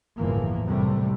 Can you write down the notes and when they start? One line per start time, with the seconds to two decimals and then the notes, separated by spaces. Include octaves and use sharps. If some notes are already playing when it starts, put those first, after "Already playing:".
0.19 G1 E2 A2 E3 F3 A#3
0.65 C2 F#2 A2 C3 G3 A3